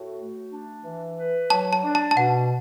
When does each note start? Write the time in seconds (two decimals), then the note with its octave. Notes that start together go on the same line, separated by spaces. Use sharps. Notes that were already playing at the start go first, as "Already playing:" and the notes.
Already playing: A2 F#4
0.17 A3
0.51 D4
0.83 E3
1.17 B4
1.50 F#3 A5
1.73 A5
1.84 D4
1.95 A5
2.11 A5
2.17 B2 F#5